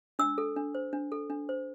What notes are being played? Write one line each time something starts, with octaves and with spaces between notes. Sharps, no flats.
D4 E6
A4
D4
C5
D4
A4
D4
C5